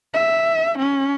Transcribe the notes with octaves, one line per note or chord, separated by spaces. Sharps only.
E5
C#4